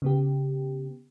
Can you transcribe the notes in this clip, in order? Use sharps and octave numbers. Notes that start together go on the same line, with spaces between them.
C#3 B3 G4